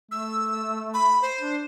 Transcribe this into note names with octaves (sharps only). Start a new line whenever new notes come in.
A3 E6
B5
C5
D4